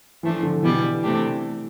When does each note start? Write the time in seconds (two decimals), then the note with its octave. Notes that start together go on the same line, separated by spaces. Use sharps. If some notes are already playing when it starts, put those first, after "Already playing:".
0.23 E3 F3 A3 D4
0.43 D3
0.63 B2 E3 G3 B3
1.03 C3 E3 A3 D4 G4